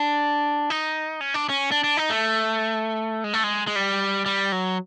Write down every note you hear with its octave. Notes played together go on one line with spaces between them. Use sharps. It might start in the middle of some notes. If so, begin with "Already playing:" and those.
Already playing: D4
D#4
C#4
D4
C#4
D4
D4
D#4
A3
G#3
A3
G#3
G#3
G3
G3
F#3